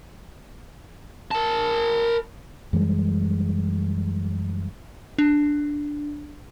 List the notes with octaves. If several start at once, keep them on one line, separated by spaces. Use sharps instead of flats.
A#4 A5
F#2 E3 G3 G#3
D4